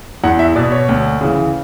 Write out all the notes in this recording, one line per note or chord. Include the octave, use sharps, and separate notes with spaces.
E2 F#5
E5
B2 D5
C#5
D2
C#3 E3